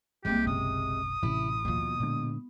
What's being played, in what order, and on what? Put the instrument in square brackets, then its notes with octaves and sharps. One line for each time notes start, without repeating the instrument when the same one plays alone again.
[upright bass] C2 A#3 [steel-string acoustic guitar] C3 G#3 [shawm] G4
[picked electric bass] F#1 B1 [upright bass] C#3 [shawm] D#6
[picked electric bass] A1 [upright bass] C3 C#4 [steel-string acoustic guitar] E4
[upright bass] D#2 F3 [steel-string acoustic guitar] B2
[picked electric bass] A#2 D3 [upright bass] G#3